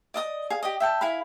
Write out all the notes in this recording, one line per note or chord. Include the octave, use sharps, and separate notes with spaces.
D5 D#5 D#6
G#4 F5
G4 D#5
E5 G5 A5
E4 G#4 F5 B5